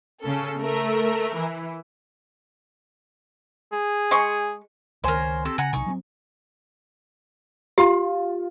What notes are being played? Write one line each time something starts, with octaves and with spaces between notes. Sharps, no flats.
C#3 C#4 A4
A3 A#4
E3
G#4
G#3 C6 C#6
C#2 D#3 A#4 C5 C#5 G#5
C4 G4 A4 C6
C#3 F#5 G#5 A#5
B1 C3 D#4 C#6
F#3 B3 C4
F4 G4 C6